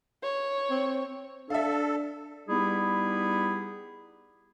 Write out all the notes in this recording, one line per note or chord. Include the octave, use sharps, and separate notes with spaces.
C#5
C4
D4 A4 E5 F5
G3 B3 D#4 E4 G4 G#4